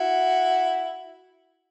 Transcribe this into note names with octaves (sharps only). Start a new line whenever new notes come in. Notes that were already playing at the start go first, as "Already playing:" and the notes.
Already playing: E4 F#4